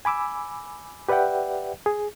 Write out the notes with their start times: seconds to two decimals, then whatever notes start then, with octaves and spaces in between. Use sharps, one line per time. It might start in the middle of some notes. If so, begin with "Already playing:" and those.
0.05 G#5 B5 D6 E6
1.09 G4 B4 D5 E5 F#5 G5
1.86 G#4